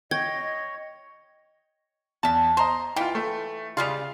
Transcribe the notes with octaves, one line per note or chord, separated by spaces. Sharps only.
C#5 D#5 G5 G#6
E2 E5 A5
C5 D#5 A#5 C6
E3 F4 G5
A3
C#3 G3 G#3 F4 F7